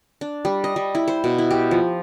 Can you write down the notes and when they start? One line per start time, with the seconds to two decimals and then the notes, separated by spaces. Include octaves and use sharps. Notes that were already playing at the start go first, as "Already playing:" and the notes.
0.21 D4
0.45 G3
0.64 D#5
0.76 G3
0.95 E4
1.08 C5
1.24 B2
1.38 E4
1.51 G4
1.71 F3